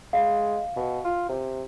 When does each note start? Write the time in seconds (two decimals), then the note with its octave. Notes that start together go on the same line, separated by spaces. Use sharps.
0.13 G#3 F5
0.76 B2
1.04 F4
1.29 C3